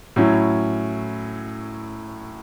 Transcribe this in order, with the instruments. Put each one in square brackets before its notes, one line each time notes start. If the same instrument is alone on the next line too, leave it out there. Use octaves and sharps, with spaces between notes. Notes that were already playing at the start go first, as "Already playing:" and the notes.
[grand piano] A2 F#3 C#4 E4